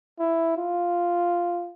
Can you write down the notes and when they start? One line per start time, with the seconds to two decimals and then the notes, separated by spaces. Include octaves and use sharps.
0.19 E4
0.57 F4